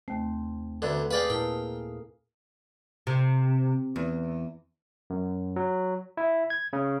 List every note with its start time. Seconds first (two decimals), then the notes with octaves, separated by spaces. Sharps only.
0.08 D#2 A3 C4
0.82 D2 D3 B4
1.11 G#4 A4 B4 D5 F5 G5
1.30 A#2 E4 A#4 B4 G5 A5
3.07 C3
3.96 E2
5.10 F#2
5.56 F#3
6.17 E4
6.50 G#6
6.73 C#3